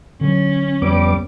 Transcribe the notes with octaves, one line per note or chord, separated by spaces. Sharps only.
D3 F#3 C#4
F2 G3 B3 D6